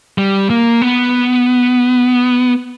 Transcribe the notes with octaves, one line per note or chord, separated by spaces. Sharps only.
G3
A#3
B3